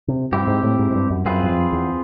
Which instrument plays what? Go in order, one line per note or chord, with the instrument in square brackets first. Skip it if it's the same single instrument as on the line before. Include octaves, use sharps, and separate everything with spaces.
[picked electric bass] C3
[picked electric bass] G2 [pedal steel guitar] C4 E4 G4
[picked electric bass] G#2
A2
G#2
G#2
G2
F#2
[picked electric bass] F#2 [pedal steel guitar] C4 F4 G#4 B4
[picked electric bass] F#2
F2
E2